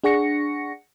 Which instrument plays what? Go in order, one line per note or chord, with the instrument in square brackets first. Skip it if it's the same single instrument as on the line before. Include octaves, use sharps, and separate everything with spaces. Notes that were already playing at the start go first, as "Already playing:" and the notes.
[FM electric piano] D4 G#4 F#5 C#6 A#6 C#7